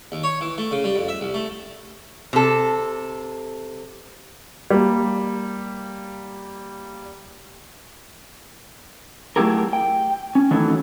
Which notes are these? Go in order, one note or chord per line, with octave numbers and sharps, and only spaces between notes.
D#2
C#5
E3
A3
C#3
G3
F2
E5
C2
A3
C3 A4
G3 A#3
F#3 A3 E4 G4 G#4 A#4
G5
C#4
D#3 E3 F#3 A3 D#4